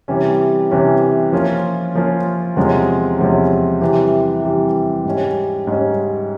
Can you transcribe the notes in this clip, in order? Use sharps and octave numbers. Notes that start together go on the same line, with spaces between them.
C3 E3 G3 C#4
C3 E3 G3 C#4
F3 A#3 C#4 F4
F3 A#3 C#4 F4
E2 C3 F3 G#3 C#4
E2 C3 F3 G#3 C#4
C3 E3 G3
C3 E3 G3
G#2 G3 C#4
G#2 G3 C#4